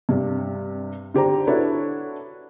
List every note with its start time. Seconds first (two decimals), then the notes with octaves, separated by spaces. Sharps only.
0.09 G2 C3
1.14 D3 G4 C5 A#5
1.47 D4 E4 F#4 A4 B4 C#5